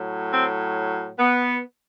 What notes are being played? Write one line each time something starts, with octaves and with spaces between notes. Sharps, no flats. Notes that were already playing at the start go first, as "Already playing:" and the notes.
Already playing: A2 F#3
C4
B3